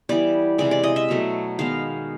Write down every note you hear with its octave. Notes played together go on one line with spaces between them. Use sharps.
E3 G3 B3 D5
C3 E3 G#3 D5
D5
D#5
E5
B2 F#3 A3
D#3 G#3 B3 F5